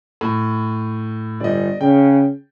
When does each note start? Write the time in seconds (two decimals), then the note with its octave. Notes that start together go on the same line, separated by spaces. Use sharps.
0.21 A2
1.40 G1 D5 D#5
1.81 C#3 G5